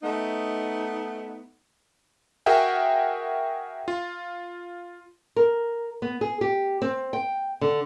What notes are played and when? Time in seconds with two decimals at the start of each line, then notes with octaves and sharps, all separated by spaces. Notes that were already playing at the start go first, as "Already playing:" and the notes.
0.03 A3 B3 D#4
2.46 F#4 G#4 A#4 E5 F#5 G5
3.88 F4
5.36 A#4
6.02 B3
6.21 G#4
6.41 G4
6.82 C4
7.13 G5
7.61 D3